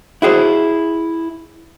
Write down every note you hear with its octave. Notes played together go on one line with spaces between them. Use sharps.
E4 F#4 G#4 C5